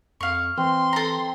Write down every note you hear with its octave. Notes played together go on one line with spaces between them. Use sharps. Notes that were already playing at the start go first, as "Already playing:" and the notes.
F2 F5 C#6
E3 C4 C6
A4 A#5